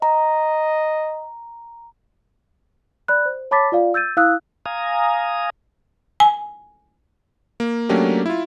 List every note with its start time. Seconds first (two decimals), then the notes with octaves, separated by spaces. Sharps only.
0.02 D#5 A#5
3.08 D5 B5 F#6
3.26 C5
3.51 C#5 A5 B5 D6 A6 B6
3.72 F4 D5 F5
3.94 E6 G6 A6 D#7
4.17 E4 F5 D#6 E6 F#6
4.66 F5 G#5 A#5 D#6
6.20 G#5
7.60 A#3
7.89 F#3 A3 A#3 C#4 D4 G4
8.26 E4 F4